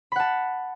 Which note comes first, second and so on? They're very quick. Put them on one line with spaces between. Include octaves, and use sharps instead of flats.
B5 F#5 A5